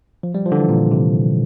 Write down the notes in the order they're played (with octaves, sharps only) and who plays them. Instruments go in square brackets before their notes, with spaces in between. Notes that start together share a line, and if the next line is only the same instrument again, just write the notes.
[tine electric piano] F3
G3
F3
D3
E3
A#2
C3